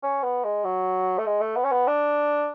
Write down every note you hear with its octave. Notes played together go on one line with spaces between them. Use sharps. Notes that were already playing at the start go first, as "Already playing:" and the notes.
C#4
B3
G#3
F#3
A3
G#3
A3
B3
C#4
B3
D4